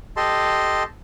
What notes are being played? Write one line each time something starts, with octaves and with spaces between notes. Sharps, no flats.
G4 A4 D#5 A5 C6